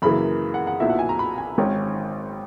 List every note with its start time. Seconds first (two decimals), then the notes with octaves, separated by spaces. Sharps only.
0.02 F#2 C#3 E3 A#3 B5
0.54 F#5
0.67 F#5
0.80 B1 A#2 F#3 B3 E4 E5
0.90 F#5
0.99 G#5
1.09 A#5
1.19 B5
1.38 G#5
1.58 G#1 G#2 D#3 G#3 C#4